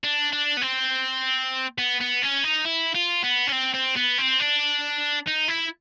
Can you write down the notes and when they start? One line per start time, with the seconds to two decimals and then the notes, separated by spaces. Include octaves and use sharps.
0.04 D4
0.33 D4
0.57 B3
0.62 C4
1.78 B3
2.00 B3
2.22 C#4
2.44 D#4
2.65 E4
2.95 F4
3.23 B3
3.47 C#4
3.52 C4
3.74 C4
3.96 B3
4.18 C4
4.40 D4
5.27 D#4
5.48 E4